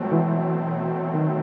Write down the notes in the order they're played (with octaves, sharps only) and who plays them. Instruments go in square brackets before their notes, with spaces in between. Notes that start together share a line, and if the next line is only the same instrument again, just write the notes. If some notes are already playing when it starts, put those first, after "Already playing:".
Already playing: [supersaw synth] B2 F#3 A3 C4 [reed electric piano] F3 G#3
[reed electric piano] E3
D#3